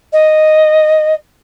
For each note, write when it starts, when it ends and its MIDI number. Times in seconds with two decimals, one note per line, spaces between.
0.12 1.14 75